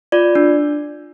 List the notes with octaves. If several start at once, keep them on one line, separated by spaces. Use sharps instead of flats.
F4 D5
D4